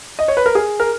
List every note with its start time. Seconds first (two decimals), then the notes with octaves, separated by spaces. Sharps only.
0.19 D#5
0.28 C#5
0.37 B4
0.46 A#4
0.55 G#4
0.80 A#4